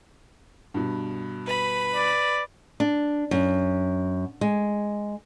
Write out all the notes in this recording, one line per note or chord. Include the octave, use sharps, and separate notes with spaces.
G2 B2
B4 B5
D5
D4
F#2
G#3